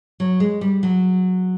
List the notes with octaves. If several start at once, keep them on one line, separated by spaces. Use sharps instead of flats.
F#3
G#3
G3
F#3